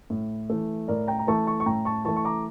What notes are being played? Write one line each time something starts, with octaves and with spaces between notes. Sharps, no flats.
A2
E3 A3
A2 A#4 D5
G5 A#5
A#5
E3 A3 A5 C#6
A5 C#6
C#6
A2 G5 A#5
A5 C#6
E3 A3 A5 C#6
C#6
A#5 D6